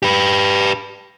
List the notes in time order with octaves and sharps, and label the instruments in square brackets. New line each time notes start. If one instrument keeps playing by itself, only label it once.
[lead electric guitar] G4 B4